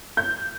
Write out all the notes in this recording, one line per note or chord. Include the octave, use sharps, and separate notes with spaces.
G6